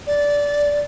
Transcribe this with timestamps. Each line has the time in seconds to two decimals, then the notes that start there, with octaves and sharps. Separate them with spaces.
0.07 D5